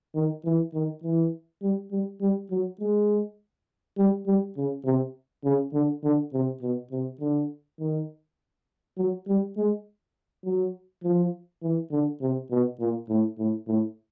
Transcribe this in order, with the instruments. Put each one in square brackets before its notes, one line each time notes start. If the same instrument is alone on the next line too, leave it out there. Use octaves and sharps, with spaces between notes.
[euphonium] D#3
E3
D#3
E3
G3
G3
G3
F#3
G#3
G3
G3
C#3
C3
C#3
D3
D3
C3
B2
C3
D3
D#3
F#3
G3
G#3
F#3
F3
E3
D3
C3
B2
A#2
A2
A2
A2